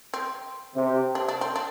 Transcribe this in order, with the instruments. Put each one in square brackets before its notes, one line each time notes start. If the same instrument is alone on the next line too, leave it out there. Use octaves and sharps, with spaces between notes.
[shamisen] C4
[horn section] C3
[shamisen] D4
D4
C4
D4